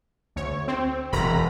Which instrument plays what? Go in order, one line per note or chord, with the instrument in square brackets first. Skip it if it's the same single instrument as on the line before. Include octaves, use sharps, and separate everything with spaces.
[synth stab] D2 C#5
C4
[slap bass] E1 [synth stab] A#5 B5